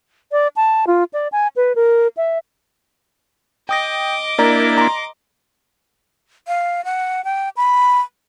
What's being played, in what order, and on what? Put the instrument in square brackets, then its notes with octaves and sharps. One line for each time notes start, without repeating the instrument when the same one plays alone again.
[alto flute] D5
A5
F4
D5
G#5
B4
A#4
E5
[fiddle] D#5 D6 [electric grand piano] G5 D#6 A#6
[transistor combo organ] A#3 D4 E4 [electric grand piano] A#4 D5 A#5
[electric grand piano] A#5 C6
[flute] F5
F#5
G5
B5